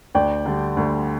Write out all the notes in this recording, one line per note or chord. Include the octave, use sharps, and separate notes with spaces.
D2 D5 G5
D3 G3
D2